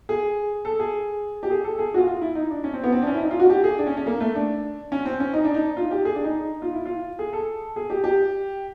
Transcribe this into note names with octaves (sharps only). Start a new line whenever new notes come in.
G#4
A4
G#4
G4
G#4
A4
G#4
F#4
F4
F4
E4
D#4
D4
C#4
C4
B3
C4
D4
C#4
E4
D#4
F4
F#4
G4
G#4
D4
C#4
C#4
A#3
A3
D4
C#4
C4
C#4
D#4
D4
D#4
F4
G4
G#4
D4
D#4
F4
E4
F4
G#4
A4
G#4
G4
G4